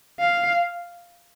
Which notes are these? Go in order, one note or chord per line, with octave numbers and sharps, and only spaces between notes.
F5